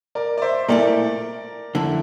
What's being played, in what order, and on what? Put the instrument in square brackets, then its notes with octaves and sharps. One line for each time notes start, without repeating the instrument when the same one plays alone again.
[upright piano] A#4 D5
D5
C5 E5
[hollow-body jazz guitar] A#2 A3 E4 [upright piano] A#4 D5
[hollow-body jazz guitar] F2 D3 A3 E4